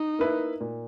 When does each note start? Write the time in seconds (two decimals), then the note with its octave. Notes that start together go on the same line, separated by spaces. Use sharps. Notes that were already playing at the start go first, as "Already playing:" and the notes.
Already playing: D#4
0.19 A#3 E4 B4 E5
0.61 A#2